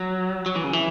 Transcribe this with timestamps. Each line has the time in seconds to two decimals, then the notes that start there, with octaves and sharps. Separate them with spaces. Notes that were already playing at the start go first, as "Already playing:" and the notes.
Already playing: F#3
0.46 F#3
0.55 E3
0.64 C#3
0.73 E3